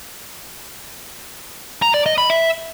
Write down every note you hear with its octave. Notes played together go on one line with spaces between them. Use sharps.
A#5
D5
D#5
B5
E5